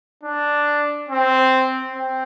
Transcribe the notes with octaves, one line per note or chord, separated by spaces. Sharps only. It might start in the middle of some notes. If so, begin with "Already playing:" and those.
D4
C4
C4